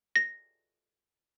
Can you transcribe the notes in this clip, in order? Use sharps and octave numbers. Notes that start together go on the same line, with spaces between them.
A#6